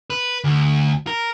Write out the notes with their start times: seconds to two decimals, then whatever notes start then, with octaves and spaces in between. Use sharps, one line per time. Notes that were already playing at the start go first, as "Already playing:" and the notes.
0.10 B4
0.44 D2
1.07 A#4